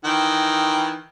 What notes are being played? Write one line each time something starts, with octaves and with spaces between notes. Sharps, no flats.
D#3 E3 G5